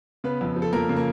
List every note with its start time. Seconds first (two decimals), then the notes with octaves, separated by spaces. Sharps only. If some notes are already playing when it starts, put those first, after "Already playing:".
0.24 C#3 B3 B4
0.41 F2
0.56 F3
0.62 A4
0.73 F2 A#3 A#4
0.89 C#3
0.97 A#3